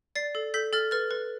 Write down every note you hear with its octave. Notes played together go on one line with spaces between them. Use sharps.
D5 A6 C7
A4
A4 G6 B6
A4 F6 A6
B4 F6 A6
B4